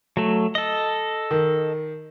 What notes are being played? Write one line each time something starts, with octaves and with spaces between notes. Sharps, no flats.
F#3 A3
A4 D#5
D#3